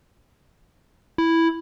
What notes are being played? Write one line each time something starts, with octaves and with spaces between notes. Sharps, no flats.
E4